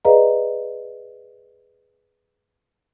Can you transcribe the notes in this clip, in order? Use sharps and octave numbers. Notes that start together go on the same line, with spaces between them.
G#4 B4 D5 D#5 F5 A#5